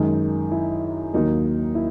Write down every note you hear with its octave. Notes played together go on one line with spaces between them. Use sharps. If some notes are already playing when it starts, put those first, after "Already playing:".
Already playing: F#2 D#3 G#3 D#4
E4
D#2 D#3 F#3 A#3 D#4
E4